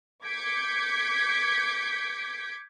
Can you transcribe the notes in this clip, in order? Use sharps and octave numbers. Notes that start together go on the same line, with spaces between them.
D6 G6 G#6 B6 C#7 D7